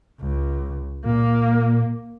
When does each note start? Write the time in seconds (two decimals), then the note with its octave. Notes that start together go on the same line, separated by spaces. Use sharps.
0.20 C#2
1.05 A#2 A#3